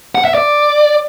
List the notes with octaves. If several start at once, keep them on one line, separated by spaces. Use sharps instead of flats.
F#5
E5
D5